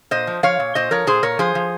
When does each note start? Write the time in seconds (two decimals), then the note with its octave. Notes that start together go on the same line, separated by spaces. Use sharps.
0.11 A#2 C5 D#5
0.27 F3
0.43 F3 C#5 F5
0.60 A#2
0.75 A#2 C5 D#5
0.91 F3 A#4 C#5
1.07 A#2 G#4 C5
1.23 A#2 A#4 C#5
1.39 F3 G#4 C5
1.55 F3